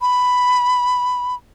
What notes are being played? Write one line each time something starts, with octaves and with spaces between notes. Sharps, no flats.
B5